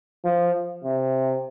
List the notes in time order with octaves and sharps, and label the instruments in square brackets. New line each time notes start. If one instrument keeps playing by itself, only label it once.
[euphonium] F3
C3